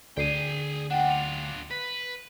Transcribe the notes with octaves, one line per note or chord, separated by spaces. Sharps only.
D2 G#4 D5 G5 C7 D#7
D4 F4 F#5 G5
F7
B4 B6